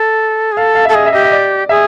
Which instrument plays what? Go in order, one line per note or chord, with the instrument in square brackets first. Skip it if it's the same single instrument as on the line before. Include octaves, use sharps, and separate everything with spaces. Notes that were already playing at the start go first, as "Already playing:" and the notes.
Already playing: [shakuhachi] A4
G#4
[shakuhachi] A4 [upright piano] F5
[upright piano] F5
E5
[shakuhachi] A4
[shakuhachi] G#4 [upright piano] D#5
[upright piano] E5
[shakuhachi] G4 [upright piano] D#5
[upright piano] D#5
D5
[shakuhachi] G#4 [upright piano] E5